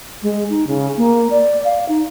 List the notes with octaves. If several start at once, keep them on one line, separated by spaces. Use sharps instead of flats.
G#3
D#4
C#3
A#3
D5
F5
D#4